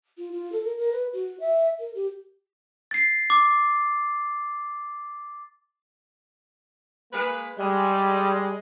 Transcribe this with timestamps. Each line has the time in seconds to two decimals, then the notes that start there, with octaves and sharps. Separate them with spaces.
0.18 F4
0.32 F4
0.52 A4
0.65 A#4
0.78 A#4
0.92 B4
1.13 F#4
1.40 E5
1.79 A#4
1.95 G4
2.91 A6 C7
3.30 D6
7.12 G#3 A#3 B4
7.58 G3 G#3